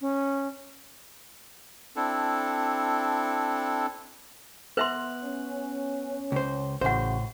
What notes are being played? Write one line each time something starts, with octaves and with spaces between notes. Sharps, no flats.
C#4
C4 D4 E4 A4
B3 B4 E5 C6 F#6
C#4
C#2 C5
A1 A2 C#3 F#4 C5 E5 F#5